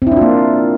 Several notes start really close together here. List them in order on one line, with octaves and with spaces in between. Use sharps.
C4 E4 D4 F4 A#3